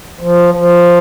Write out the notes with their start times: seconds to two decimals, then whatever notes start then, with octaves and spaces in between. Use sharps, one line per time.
0.21 F3
0.54 F3